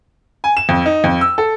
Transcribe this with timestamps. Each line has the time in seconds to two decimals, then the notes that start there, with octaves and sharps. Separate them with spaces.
0.44 G#5
0.57 E7
0.69 F2
0.86 D#4
1.04 F2
1.21 E6
1.38 A4